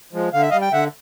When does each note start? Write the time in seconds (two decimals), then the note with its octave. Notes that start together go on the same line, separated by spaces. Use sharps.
0.13 F3 G#3
0.33 D3 F5
0.42 E5
0.50 D#5 F5
0.53 G3
0.61 G5
0.72 D3 E5 F#5